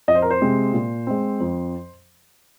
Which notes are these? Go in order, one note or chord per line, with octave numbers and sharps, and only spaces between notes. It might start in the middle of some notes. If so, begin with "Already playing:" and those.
F2 D#5
C5
A#4
C5
C3 G#3 C4
A#2
G#3 C4
F2